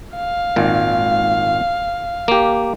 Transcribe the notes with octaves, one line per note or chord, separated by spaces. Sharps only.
F5
G#1 A#2
A#3 G4